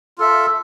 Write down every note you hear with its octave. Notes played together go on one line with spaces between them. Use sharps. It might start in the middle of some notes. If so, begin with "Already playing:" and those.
F4 A4 E5